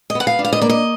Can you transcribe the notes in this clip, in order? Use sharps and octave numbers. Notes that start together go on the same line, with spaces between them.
D#5
B3 F#5
F5
D4
F5
D#5
A#3 D5
D#5